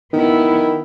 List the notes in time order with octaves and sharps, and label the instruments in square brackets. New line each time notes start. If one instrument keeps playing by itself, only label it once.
[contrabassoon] D#3 [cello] B3 E4